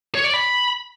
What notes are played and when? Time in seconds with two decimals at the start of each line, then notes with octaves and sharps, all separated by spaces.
0.15 C#5
0.24 D5
0.34 B5